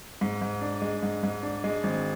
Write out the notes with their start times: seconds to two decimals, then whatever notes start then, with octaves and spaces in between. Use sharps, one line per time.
0.21 G#2
0.42 G#2
0.61 D4
0.82 G#3
1.03 G#2
1.23 G#2
1.43 D4
1.64 G#3
1.83 G#1